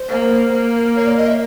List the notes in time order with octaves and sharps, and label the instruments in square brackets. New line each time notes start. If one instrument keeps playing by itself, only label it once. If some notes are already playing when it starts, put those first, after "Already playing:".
Already playing: [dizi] C5
[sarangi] A#3
A#3
[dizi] C#5
D5
D#5
E5